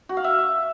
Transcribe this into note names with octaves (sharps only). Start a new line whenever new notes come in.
F#4
F5
E5